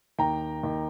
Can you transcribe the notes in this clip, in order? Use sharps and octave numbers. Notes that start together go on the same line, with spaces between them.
D#2 G5 A#5
D#2